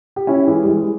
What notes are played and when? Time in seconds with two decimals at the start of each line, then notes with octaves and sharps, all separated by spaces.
0.16 G4
0.27 C#4 E4
0.48 E3 G#3
0.63 G3
0.69 E3 G#3